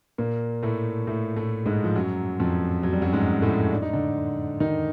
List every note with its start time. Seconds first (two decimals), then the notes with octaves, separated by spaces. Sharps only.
0.18 A#2 A#3
0.63 A2 A3
1.07 A2 A3
1.36 A2 A3
1.66 G#2 G#3
1.84 F3
1.95 F#2 F#3
2.40 F2 F3
2.83 F#3
2.93 G3
3.02 F#2 F#3
3.13 G#2 G#3
3.42 A2 A3
3.72 D4
3.82 D#4
3.93 D3 D4
4.60 D#3 D#4